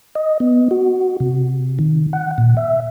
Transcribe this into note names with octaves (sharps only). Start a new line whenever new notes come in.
D#5
B3
F#4
C3
D#3
F#5
A#2
E5